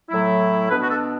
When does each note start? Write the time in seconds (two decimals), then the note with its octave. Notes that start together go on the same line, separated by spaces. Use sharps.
0.10 A2 F#3 A3 E4
0.70 B2 B3 D4 B4
0.82 F#4
0.89 A4